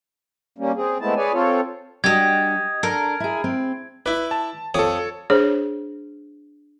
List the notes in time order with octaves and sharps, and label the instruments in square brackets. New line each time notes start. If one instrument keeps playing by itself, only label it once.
[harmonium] G3 A#3 C#4
C4 G#4
G#3 A3 B3 C4 E4 A5
G#4 B4 C#5 D5 G#5
C4 F4 A4 C#5
[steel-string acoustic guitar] G3 D4 F#4 [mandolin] G4 D#5 [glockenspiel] G#6
[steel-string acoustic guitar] D4 A4 [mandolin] A#4
[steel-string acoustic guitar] E4 G#4
C4
[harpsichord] E4 D5 [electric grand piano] B4
[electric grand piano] A5
[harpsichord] F2 D5 D#6 [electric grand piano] A4 C#5
[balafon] D4 G#4 C5 C#5